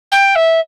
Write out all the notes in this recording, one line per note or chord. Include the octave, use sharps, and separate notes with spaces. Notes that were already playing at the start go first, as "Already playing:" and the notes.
G5
E5